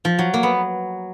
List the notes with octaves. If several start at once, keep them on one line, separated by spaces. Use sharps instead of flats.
F3
F#3
A#3
B3